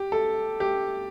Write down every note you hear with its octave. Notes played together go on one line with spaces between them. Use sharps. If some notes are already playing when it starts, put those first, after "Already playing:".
Already playing: G4
A4
G4